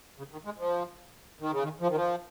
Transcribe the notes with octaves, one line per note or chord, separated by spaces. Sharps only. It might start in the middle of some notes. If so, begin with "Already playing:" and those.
C#3
D#3
G#3
F3
D#3
C#3
D#3
F3
D#3
F3